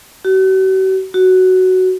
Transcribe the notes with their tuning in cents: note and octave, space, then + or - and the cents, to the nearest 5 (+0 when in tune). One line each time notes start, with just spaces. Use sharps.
F#4 +45
F#4 +5